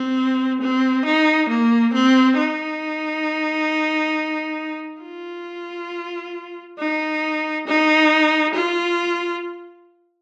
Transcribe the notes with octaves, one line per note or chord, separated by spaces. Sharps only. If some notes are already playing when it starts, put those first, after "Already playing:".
Already playing: C4
C4
D#4
A#3
C4
D#4
F4
D#4
D#4
F4